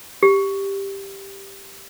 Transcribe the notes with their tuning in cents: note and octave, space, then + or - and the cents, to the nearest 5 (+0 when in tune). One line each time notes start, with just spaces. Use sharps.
G4 +5